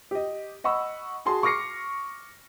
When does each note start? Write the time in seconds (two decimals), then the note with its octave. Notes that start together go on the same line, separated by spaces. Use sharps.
0.11 G4 D#5
0.64 D#5 F#5 B5 C#6 E6
1.25 F#4 G#4 A5 C6
1.43 C#6 D6 F6 A#6 C7 C#7